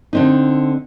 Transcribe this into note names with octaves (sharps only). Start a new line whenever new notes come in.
D3 C4 D#4